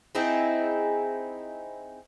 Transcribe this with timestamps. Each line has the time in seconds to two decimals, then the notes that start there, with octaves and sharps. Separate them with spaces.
0.15 C4 D#4 E4 G#4